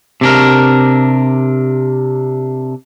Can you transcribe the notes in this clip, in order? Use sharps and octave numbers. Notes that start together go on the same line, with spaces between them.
C3 D4 A#4